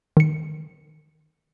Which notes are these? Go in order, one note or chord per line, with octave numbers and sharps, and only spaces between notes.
D#3 C#7